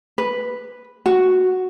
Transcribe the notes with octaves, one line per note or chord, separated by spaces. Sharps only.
B4
F#4